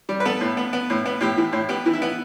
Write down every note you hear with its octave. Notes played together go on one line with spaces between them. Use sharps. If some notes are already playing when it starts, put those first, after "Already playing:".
G3
B4
B3 A4
A2
B3
B3
A2
B3
A2 G4
E3
A2
B3 G4
E3
E4
B3